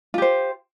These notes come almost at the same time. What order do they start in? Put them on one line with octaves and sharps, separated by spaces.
F4 G4 C5